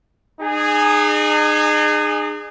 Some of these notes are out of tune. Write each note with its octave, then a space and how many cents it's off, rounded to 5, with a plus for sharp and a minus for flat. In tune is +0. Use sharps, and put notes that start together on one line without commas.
D#4 -40 G#4 -5